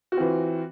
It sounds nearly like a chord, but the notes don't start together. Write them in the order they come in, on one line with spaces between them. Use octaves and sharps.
F#4 F4 C4 E3